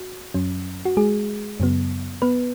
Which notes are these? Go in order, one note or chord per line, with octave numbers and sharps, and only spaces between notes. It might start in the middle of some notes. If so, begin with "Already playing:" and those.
Already playing: F#4
F#2 F#3 C#4
F#4
G#3 G#4
F#2 C#3 F#3 B3
B3 B4